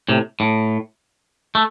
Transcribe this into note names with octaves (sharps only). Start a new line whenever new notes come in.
A2 C3
A2
A3